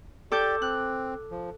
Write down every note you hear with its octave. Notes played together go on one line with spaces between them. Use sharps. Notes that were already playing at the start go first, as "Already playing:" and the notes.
G4 A4 D5 D6 G6
C4 F#6
F3